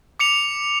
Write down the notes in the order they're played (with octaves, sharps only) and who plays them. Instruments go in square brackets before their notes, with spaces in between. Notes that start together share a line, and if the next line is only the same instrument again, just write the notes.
[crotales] D6 C#7 F7